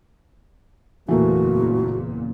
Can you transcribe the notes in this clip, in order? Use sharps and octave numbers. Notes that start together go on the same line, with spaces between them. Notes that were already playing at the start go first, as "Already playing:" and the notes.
F#1 E2 A#2 E3 A3 A#3 F#4